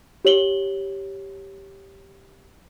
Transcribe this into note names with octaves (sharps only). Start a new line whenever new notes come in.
G4 C#5 F#7 G7